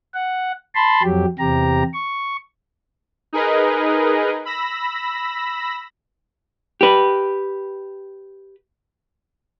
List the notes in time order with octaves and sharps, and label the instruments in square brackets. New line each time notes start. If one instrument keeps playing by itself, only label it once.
[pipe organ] F#5
A5 B5 C6
F2 F#3 G4
E2 C3 G4 A#5
C#6
[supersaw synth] D#4 G#4 A#4 B4 D#5
B5 E6 A#6
[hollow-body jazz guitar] G4 B4